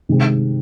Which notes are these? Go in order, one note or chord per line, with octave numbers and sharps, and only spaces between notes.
C3 D#3 G#3 C4